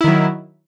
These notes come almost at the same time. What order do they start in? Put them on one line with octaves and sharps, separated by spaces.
E4 D#3 F#3